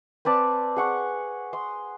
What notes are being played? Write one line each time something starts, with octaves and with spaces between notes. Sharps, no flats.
C4 B4 D5 A5
G#4 F#5 C#6
C6 D#6